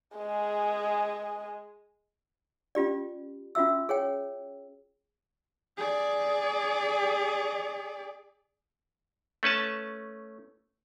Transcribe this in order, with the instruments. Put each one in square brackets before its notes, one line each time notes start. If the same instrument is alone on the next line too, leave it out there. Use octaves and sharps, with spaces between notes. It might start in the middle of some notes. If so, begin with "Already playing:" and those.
[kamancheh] G#3 G#4
[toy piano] C#4 F4 G4 D5
C#4 F4 F#4 E5 E6
G#4 C#5 G5
[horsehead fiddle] G#4 D5
[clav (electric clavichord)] A3 C#4 B4 A5